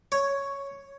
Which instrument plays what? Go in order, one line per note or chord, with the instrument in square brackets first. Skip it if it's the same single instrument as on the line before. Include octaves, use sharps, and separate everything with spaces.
[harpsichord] C#5